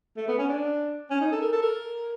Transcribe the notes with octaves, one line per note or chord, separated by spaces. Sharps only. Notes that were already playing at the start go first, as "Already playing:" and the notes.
A3
B3
C#4
D4
C#4
D#4
A4
A#4
A4
A#4